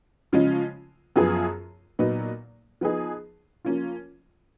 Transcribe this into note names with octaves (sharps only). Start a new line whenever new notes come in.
C#3 F3 G#3 C#4 F4
F#2 F3 B3 F4 G#4
A#2 F#3 B3 D#4
F3 B3 D#4 G#4
F3 A#3 C#4 F4